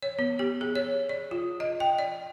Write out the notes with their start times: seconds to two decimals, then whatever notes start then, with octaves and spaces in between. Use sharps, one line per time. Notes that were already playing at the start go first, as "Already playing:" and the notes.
0.02 C#5
0.19 B3
0.39 G4
0.61 G#4
0.75 C#5
1.09 D5
1.31 F4
1.60 D#5
1.80 G5
1.99 D5